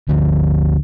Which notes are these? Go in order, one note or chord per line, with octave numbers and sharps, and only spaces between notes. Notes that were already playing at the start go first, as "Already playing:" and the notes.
D2 D3 F3